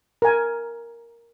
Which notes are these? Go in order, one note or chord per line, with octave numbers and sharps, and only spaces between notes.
A#4 G#5